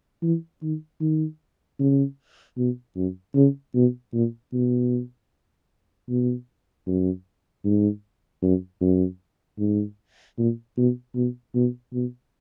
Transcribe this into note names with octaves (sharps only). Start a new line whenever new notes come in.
E3
D#3
D#3
C#3
B2
F#2
C#3
B2
A#2
B2
B2
F#2
G#2
F#2
F#2
G#2
A#2
B2
B2
B2
B2